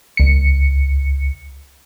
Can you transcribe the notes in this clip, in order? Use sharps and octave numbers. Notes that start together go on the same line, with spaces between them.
C#2 C#7